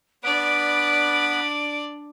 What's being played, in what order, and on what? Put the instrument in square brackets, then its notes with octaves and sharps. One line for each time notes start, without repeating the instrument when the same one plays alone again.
[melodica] B3 B4 B5 [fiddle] D4 D5 [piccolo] D7